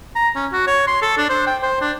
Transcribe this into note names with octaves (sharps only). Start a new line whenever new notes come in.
A#5
C#4
F#4
C#5
C6
A4
D4
C5
G5
C5
D4